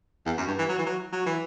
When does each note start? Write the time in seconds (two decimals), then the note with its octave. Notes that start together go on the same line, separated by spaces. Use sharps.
0.26 E2
0.38 F#2
0.47 G2
0.59 E3
0.69 F#3
0.78 E3
0.86 F#3
1.12 F#3
1.26 E3